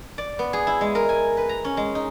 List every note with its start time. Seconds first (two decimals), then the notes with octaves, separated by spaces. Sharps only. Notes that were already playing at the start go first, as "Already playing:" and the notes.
0.18 D5
0.39 B3
0.53 G#4
0.67 E4
0.81 G#3
0.95 A#4
1.09 G#5
1.37 B4
1.49 A#5
1.65 C#4
1.77 G#3
1.95 D#4